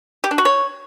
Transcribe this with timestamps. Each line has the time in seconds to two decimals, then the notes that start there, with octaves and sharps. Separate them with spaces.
0.24 G4
0.31 D4
0.38 F#4
0.45 C#5